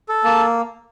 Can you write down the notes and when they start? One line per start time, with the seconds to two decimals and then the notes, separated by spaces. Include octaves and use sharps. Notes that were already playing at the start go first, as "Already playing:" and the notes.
0.09 A4
0.24 A#3 A5